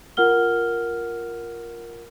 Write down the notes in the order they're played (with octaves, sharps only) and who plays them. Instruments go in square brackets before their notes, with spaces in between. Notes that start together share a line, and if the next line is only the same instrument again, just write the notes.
[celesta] F4 A#4 F#5 F6 G7